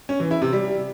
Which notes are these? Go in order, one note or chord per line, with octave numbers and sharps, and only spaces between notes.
C#4
E3
E4
C3
G3